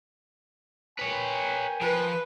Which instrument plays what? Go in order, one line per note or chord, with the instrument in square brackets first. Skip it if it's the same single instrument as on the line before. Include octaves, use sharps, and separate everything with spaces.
[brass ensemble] A#4 G5 G#5 [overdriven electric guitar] B4 C#5
[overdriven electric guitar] F3 [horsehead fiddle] B4